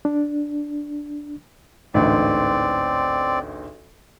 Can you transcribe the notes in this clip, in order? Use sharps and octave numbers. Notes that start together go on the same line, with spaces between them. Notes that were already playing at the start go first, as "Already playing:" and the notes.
D4
A1 D2 G#2 C4 D5